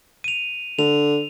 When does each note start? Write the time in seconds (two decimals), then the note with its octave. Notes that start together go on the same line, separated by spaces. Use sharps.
0.24 D#7 F7
0.79 D3 F7